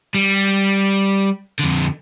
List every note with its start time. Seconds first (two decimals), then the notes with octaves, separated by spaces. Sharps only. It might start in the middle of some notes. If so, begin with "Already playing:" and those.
0.15 G3
1.59 F2 D3